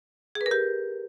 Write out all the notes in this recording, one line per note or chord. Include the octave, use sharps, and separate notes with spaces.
G#4
B4
A#4
G4